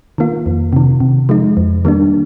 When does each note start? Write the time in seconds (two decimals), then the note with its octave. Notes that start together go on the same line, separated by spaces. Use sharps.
0.18 D#3 A#3 F4
0.46 F2
0.73 C3 D#3
1.00 C3
1.29 F3 G#3 D#4
1.57 F2
1.85 D#3 G3 A#3 D4